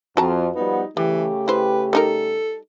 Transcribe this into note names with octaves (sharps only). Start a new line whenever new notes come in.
F2 F4 F#4 A5 A#5
F3 G3 B3 D#4
C#3 E3 G3 A3 G4
E4 B4 C5
G3 D#4 A4 A#4